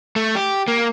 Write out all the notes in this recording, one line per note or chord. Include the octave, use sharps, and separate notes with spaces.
A3
G4
A#3